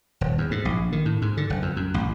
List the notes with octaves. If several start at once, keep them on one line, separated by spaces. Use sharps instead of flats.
D#1
E2
G#2
A#1
D#3
A2
G#2
D3
F#1
F2
F#2
A1